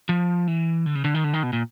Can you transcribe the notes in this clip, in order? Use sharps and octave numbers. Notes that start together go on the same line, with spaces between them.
F3
E3
D3
C#3
D3
D#3
D3
D#3
B2
A#2